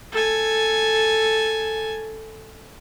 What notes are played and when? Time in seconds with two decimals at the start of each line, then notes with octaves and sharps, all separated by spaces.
0.12 A4 G#5